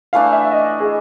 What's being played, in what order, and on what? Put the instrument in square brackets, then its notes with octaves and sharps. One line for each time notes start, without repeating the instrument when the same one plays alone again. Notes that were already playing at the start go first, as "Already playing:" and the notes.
[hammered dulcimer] E3 A3 D4 [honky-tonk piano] F5
[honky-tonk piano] E5
D#5
G#4